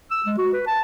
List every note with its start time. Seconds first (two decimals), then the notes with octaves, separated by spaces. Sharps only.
0.11 E6
0.26 G#3
0.38 F#4
0.53 B4
0.67 A5